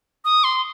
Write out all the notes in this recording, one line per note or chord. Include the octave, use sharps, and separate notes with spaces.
D#6
C6